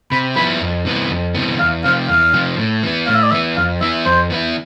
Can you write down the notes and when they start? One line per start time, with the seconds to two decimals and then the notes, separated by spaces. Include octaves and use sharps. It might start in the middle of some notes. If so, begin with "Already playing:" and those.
0.11 C3 B5
0.36 F3 B3 E4 B5
0.61 F2
0.85 C3 E3 B3
1.10 F2
1.35 C3 E3 B3
1.59 E2 F5
1.84 C3 F3 F5
2.08 E2 F5
2.33 C3 F3
2.58 A2
2.83 E3 B3
3.07 A2 F5
3.15 E5
3.23 D5
3.31 E3 B3 E5
3.57 F2 F5
3.81 E3 B3 E4 E5
4.06 F2 C5
4.30 E3 B3 E4